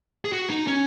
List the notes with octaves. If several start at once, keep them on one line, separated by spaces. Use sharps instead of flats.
G#4
F#4
D#4
C#4